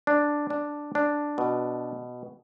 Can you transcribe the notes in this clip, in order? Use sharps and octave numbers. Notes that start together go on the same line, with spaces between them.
D4
D4
D4
B2